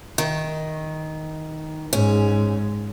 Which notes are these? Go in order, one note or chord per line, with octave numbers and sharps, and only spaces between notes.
D#3
G#2 C#4